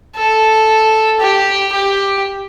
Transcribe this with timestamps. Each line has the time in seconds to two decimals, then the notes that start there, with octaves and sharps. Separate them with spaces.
0.16 A4
1.20 G4
1.72 G4